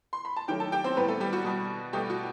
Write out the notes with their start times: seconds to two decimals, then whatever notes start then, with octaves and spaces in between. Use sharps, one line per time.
0.13 C6
0.25 B5
0.36 A5
0.48 D#3 F#3 A3 G4 G5
0.60 A4 A5
0.72 G4 G5
0.84 C4 C5
0.97 A2 G3 B3 B4
1.08 A3 A4
1.20 G3 G4
1.33 F#4
1.45 B2 G3
1.93 B2 G3 A3 G4
2.10 F#4